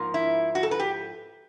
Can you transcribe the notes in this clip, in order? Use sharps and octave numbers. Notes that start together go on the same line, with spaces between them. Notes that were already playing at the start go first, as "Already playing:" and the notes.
Already playing: G#2 F3 A#3
E4
F#4
A4
B4
G4